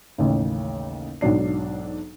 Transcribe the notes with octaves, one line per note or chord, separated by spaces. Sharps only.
A1 D#2 C#3
B1 G#2 F#3 D4 C7